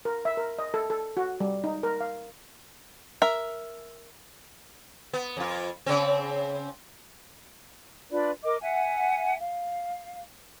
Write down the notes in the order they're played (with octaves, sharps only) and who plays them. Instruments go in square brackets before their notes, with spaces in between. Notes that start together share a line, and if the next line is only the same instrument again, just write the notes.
[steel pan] A#4
E5
A#4
D#5
A4
A4
F#4
G3
D#4
A#4
F5
[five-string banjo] A#4 E5
[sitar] B3
F2 F4
C#3 C4
[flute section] D4 F4 B4 D5
A#4 D#5 D6
E5 F#5 G#5
F5